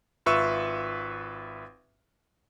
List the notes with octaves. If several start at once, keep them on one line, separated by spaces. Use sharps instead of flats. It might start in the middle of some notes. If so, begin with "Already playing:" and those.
G#1 F4 B4 E5 C#6 E6